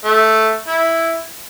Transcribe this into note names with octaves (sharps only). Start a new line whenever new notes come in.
A3
E4